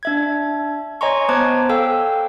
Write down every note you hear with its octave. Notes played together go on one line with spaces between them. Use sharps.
D4 E5 G#6
C#5 D#5 G#5 A#5 C6 C#6
B3 C5 A5 D6 F#6 G#6
A4 F5 G5 E6